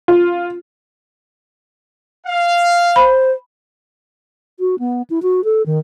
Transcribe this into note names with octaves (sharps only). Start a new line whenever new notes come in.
F4
F5
C5 B5
F#4
B3
E4
F#4
A4
D#3